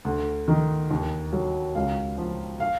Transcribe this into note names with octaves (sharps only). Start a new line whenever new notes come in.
D2
D#3
D#2
F#3
C#2 F5
F3
F5